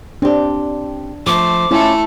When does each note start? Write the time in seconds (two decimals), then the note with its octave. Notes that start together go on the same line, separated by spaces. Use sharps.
0.22 C4 D4 G4
1.26 F3 A3 C5 D6
1.71 A3 C#4 E4 F4 A4